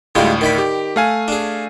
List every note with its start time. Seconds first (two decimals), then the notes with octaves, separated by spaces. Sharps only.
0.15 D2 A2 G3 G#3 F4
0.41 D#3 D5 B5
0.58 G4
0.96 A3 F5 G#5
1.28 D4 G#4